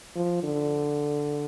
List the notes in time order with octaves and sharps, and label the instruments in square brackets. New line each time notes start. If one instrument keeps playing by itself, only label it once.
[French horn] F3
D3